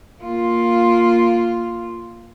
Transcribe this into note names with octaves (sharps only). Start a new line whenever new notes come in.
A#3 F4